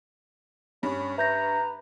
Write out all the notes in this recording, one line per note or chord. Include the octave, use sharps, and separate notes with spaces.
G2 C#4
B4 E5 A#5 G6 A#6